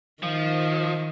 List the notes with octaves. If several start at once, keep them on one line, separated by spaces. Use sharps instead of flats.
D#3 F3